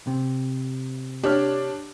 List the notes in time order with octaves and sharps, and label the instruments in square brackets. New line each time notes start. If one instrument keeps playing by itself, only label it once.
[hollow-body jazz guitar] C3
[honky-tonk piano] D4 [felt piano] G4 C#5 F6